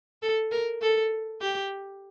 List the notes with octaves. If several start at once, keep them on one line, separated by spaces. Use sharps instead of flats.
A4
A#4
A4
G4